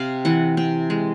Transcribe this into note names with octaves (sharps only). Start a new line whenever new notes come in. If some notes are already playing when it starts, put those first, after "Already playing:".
Already playing: C3 F5
E3 F#5
C3 G5
G#3